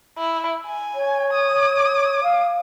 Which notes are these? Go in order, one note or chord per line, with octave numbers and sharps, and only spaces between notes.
E4
G#5
C#5
D#6
F5